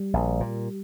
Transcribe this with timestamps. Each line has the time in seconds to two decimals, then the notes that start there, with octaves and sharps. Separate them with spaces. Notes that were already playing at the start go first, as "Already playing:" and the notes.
Already playing: G3
0.14 A#1
0.40 A#2